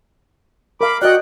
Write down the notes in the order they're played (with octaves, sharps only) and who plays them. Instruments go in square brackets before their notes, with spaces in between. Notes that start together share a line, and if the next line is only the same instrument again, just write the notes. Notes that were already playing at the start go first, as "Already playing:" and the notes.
[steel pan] A#4 F5 [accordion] B5 D6
[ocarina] F#4 [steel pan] D5 D#5 [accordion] F#5 G5 F#6